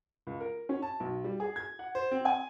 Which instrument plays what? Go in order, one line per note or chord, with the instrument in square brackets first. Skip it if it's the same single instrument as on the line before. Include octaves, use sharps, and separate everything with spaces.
[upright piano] C#2
A#4
C#4
A5
B1
G3
G#4
G#6
F#5
C5
C4
G#5